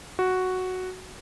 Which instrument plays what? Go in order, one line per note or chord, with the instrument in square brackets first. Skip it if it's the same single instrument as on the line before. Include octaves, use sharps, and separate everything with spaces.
[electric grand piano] F#4